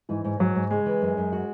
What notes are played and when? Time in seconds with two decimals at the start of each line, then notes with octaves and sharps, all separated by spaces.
0.09 G#2 E3
0.24 G#2
0.39 G#2 F#3
0.55 G#2
0.71 C#3 G#3
0.86 E3
1.01 F#2
1.17 F#2
1.32 F#4